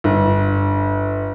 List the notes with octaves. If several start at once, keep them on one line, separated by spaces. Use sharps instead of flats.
G1